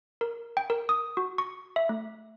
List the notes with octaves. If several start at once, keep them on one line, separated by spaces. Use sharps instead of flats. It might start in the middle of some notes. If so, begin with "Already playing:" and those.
A#4
G5
A#4
D#6
F#4
C#6
E5
A3